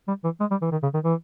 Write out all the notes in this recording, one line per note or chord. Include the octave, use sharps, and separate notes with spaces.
G3
E3
G#3
G3
E3
D#3
C#3
D#3
E3